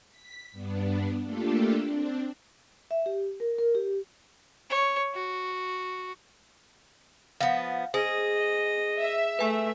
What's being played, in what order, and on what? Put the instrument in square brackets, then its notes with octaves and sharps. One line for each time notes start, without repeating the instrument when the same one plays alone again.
[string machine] B6
G2 B3 D4
A3 A#3 D4 F4 G4 A4
C4 D4
[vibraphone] E5
G4
A#4
A#4
G4
[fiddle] C#5
F#4
[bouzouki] F3 B3 [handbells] F5 F#5
[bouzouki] G#4 [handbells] C5 [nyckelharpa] D#5
[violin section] E5
[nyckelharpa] A3 [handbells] B4 G#5